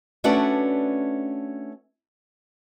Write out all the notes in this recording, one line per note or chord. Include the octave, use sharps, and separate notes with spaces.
A3 C#4 D4 F#4 B4 D5